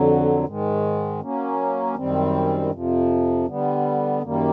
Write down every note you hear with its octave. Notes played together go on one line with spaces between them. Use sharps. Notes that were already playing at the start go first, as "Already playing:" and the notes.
Already playing: F2 D3 F#3
G#2 D#3 G#3
F#3 A#3 C#4
F#2 D#3 G3 C4
F2 C3 F3
D3 G3 B3
F#2 D#3 G3 A#3